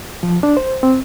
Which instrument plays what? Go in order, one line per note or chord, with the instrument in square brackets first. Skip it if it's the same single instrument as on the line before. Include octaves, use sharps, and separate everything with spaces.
[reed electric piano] F3
D4
C5
C4